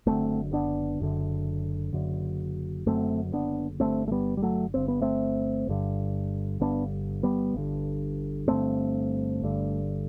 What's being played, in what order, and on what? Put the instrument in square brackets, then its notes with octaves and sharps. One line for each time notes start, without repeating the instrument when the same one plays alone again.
[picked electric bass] F#1 F#2 D3 A3 C4
B3 D4
F#1 F#2 D3
F#1 F#2 D3
F#1 F#2 D3 A3 C4
B3 D4
G1 G2 D3 A3 C4
A3
G3 B3
G3
F#3 A3
G1 G2 D3 C4
B3
A3 C4
G1 G2 D3
G1 G2 D3 B3 D4
G3 B3
G1 G2 D3
G1 G2 D3 A3 C4
G1 G2 D3